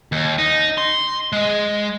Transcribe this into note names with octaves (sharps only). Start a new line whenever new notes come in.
D#2
D#4
C6
G#3